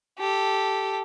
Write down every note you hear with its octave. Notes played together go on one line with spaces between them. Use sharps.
G4 A4